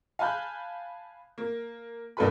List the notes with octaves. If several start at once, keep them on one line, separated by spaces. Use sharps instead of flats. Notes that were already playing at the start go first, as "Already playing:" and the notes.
F5 G#5 A5 B5 F#6 G6
A#3
C2 G2 A#3 A4 B4 B5